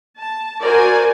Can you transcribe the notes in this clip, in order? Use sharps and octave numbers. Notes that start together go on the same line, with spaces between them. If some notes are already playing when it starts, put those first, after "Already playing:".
A5
F#4 A#4 C5 D5 G#5